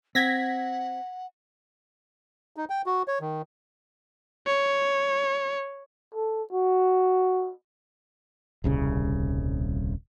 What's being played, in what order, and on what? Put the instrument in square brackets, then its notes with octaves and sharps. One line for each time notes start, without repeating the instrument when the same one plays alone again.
[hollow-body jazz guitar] C4 [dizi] F#5 [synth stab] G#6 A#6 B6
[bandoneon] D#4
G5
F#4
C#5
D#3
[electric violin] C#5
[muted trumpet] A4
F#4
[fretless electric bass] D#1 C2 C#3